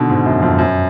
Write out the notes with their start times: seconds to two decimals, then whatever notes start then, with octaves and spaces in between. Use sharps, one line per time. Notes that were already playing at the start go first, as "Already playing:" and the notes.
Already playing: B2 D3 D#3
0.09 G#2
0.26 F#2
0.42 F2
0.58 F#2